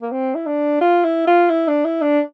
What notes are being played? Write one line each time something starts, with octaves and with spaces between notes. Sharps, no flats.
A#3
C4
E4
D4
F4
E4
F4
E4
D4
E4
D4